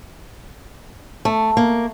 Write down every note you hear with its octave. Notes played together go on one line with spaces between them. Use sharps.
A3
A#3